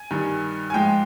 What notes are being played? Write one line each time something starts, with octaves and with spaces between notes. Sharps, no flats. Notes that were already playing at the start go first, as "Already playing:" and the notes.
Already playing: G#5
G2 D#3 G3
G#5
G#2 F3 G#3 G5